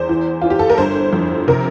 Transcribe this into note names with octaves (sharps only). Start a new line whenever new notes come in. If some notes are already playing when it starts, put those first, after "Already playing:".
Already playing: E2 C5
E3
E3 F4
G4
A4
A#4
G1 C5
F2
C3 A#4